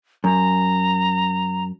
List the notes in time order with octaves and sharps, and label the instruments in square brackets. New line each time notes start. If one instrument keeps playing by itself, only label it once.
[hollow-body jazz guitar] F#2 [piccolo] A#5